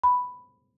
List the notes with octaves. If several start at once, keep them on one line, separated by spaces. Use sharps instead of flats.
B5